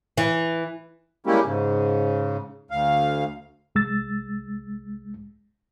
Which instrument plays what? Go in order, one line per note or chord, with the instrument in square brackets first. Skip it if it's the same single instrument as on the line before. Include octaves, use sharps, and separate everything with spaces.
[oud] E3
[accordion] G3 G#3 A#3 C#4 E4 G4
G#2 C#3
D2 F5
[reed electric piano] C2 G#3 E6 A6